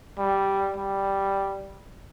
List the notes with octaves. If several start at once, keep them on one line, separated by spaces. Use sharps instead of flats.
G3
G3